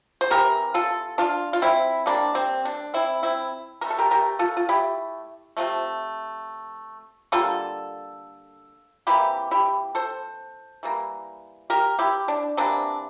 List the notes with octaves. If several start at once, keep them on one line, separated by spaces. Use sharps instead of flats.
C5
C3 E3 A3 G4 A#4
F4 A4
D4 F4
F4
C4 E4
C3 G3 A#3 D4
C4
D4
C4 E4
C4 E4
E3 A3 A#4
A4
G4 A#4
G4 A#4
F4 A4
F4
E4 G4
C3 F3 A3
D3 G3 A#3 F4 A4
C3 E3 A#3 E4 G4
E4 G4
A4 C5
E3 G3 A#3
G4 A#4
E4 G4
D4
C3 E3 A#3 D4